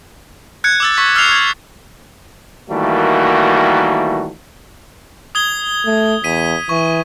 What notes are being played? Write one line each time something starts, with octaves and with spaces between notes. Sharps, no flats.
F#6 G#6 C#7
D6 E6 A6
C#6 B6
E6 F6 G#6 C7 F7
G#6
D#3 E3 G3 A3 A#3 F#4
D#6 G#6 G7
A3
E2 B6 D#7
E3 C#6